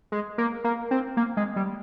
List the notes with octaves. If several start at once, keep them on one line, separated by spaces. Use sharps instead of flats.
G#3
A#3
A#3
C4
A#3
G#3
G3